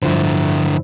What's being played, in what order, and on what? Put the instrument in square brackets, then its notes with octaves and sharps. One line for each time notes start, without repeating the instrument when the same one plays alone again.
[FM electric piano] G2 F3 C5 [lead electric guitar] D3 E4